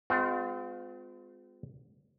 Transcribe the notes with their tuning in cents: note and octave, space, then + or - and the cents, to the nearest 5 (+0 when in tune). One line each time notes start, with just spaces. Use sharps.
G#3 +0 C4 -40 F4 +25